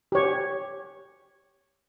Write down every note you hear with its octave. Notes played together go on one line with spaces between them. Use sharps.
G4 C#5